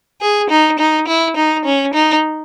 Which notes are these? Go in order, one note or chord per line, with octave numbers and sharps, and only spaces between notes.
G#4
D#4
D#4
E4
D#4
C#4
D#4